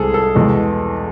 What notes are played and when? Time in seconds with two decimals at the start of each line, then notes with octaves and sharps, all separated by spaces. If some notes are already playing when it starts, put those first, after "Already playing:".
Already playing: C2 C3 G#3 G#4 A4
0.14 A4
0.35 E2 B2 G#3